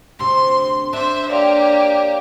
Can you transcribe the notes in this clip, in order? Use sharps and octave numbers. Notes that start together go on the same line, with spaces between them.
D2 C3 C6
D4 C5 E5
A#3 G4 C#5 D5 F5